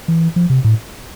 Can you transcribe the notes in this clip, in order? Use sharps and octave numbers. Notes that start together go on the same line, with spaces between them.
E3
F3
C3
A2